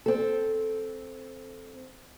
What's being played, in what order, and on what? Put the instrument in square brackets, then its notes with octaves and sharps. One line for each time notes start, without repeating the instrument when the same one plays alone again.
[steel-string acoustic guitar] C4 A4